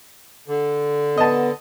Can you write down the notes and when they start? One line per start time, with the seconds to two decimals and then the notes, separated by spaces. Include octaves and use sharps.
0.48 D3
1.18 B3 D#5 A5